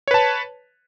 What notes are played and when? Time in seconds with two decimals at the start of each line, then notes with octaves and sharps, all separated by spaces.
0.08 C#5
0.11 B4
0.14 A5